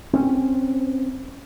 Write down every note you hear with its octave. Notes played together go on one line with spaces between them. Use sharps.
C4 C#4